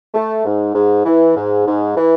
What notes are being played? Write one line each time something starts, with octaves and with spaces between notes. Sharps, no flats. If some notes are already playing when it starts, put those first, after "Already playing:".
A3
G#2
G#2
E3
G#2
G#2
E3